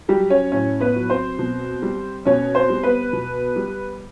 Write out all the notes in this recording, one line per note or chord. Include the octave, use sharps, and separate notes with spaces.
F#3 G3 G4
C#4 C#5
A2 C#4 C#5
B3 B4
F#3
C4 C5
B2
G3
B2 C#4 C#5
C4 C5
G3
B3 B4
B2
G3